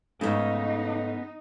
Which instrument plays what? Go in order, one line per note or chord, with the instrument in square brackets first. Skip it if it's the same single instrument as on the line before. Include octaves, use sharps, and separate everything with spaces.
[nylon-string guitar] G#2 A3 [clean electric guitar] C#3 [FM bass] B3 [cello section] D#4